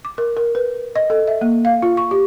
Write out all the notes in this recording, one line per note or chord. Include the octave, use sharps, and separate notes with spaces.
D6
A#4
A#4
B4
D#5
A4
E5
A#3
F5
F4
C#6
G4